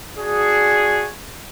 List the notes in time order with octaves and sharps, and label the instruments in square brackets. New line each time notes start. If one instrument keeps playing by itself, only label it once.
[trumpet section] D4 F#4 G#4